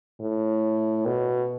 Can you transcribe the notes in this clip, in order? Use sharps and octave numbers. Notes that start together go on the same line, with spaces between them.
A2
B2